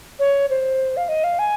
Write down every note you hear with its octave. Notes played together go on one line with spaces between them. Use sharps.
C#5
C5
F5
D#5
F5
G#5